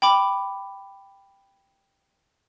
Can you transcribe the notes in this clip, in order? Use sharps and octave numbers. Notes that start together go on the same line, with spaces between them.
G5 B5 D6